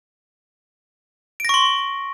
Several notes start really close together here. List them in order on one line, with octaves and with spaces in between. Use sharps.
D7 A#6 C#6 C6